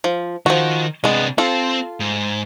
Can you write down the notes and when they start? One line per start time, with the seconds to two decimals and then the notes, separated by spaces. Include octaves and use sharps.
0.04 F3
0.46 D#3 F3 F#4
1.04 C3 G#3 B3 D4
1.38 C4 F4 A4
2.00 G#2